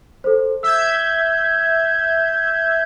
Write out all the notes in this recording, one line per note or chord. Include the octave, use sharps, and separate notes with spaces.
A4 C5
E5 E6 G6 G#6